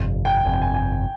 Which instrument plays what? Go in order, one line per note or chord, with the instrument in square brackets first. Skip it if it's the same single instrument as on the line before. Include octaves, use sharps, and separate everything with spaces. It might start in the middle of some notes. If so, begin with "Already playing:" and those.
Already playing: [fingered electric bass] G1 F2 C3
[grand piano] G5
[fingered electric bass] G1 F2 C3 [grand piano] G#5
[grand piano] G5
G#5
G#5